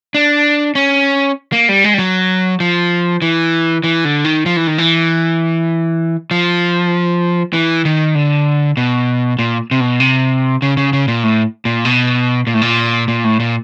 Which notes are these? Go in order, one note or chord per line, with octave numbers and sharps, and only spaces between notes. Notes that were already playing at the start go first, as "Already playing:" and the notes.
D4
C#4
A#3
G3
G#3
G3
F#3
F3
E3
E3
D3
D#3
F3
E3
D#3
E3
F3
E3
D#3
D3
B2
A#2
C3
B2
C3
C#3
C#3
C#3
A#2
A2
A#2
B2
A#2
A2
A#2
A#2
A2
A#2